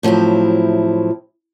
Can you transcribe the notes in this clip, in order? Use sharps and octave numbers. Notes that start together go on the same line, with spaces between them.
A2 F3 F#3 C4 E4